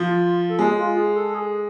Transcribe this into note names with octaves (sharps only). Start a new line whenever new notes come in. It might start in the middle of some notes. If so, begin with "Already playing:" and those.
Already playing: F3 F4
A4
G#3 G#4
F4
G#4
A4
A4
G#4